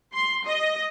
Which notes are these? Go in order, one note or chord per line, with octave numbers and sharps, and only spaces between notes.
C6
D#5